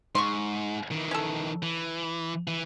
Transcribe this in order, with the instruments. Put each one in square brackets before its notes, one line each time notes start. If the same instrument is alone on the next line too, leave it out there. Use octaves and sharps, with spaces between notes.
[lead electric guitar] G#2 [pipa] C6 C#6
[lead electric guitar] D#3 E3
[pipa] C#4 A4
[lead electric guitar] E3
E3